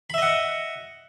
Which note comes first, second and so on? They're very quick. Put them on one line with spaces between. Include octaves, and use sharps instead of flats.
B5 E5 D#5 F#5